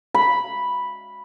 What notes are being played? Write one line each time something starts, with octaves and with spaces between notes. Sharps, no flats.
B5